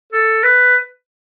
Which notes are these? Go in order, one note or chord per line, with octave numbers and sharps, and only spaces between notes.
A4
B4